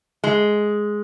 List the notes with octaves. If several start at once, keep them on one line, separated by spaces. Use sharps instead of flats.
G#3